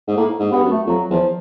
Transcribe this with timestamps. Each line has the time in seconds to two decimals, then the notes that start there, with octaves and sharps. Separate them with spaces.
0.08 G#2
0.17 A2 A#3
0.40 G#2
0.52 G2 B3
0.63 F#2
0.70 A3
0.86 F2 F#3
1.10 E2 F3